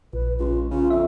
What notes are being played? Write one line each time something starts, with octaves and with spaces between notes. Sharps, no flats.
A#1 B4
C#2 F4
C#3 F4
F2 E5